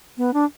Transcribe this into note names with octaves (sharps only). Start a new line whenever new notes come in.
B3
D4